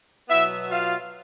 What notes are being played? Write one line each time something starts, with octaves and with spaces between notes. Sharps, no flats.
B2 F#3 B3 E4 E5
F4 F5